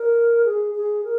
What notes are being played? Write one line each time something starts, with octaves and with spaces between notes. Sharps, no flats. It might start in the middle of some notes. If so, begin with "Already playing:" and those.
Already playing: A#4
G#4
G#4
A#4